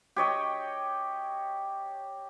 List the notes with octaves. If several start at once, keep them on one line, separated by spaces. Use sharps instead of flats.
G4 C#5 D#5 G5